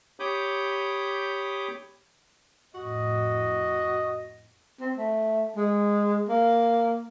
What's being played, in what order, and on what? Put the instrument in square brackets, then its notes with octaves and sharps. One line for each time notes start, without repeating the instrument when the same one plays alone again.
[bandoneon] G4 C#5 B5 D6 D#6 G6
[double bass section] F2 A2 [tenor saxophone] F#4 [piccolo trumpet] D#5
[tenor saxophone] C4
A3
G#3
A#3